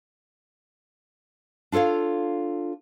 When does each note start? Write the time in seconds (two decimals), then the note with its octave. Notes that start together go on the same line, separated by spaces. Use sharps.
1.72 D4 F4 A4 C#5 F5